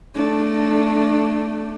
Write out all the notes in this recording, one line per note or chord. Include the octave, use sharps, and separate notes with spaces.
A3 D4